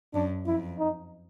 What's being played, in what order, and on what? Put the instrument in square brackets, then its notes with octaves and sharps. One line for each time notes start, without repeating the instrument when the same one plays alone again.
[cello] F#2 [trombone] D4
[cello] F2 [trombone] E4
[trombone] D#4